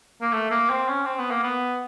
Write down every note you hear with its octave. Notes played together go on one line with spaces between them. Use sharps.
A#3
A3
A#3
C4
C#4
C4
B3
A#3
B3